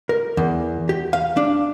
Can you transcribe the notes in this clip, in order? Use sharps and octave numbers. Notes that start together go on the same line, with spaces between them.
A#4
E2
G4
F5
D4